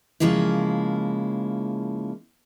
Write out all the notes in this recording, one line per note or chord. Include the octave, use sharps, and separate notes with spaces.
C#3 F3 G#3 A#3 E4